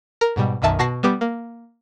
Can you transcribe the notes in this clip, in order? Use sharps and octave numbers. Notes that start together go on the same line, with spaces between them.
A#4
G#2 B2 G3
B1 F#2 D#3 E5 A5
B2 F#4 A5 A#6 C7
G3 B3 G4
A#3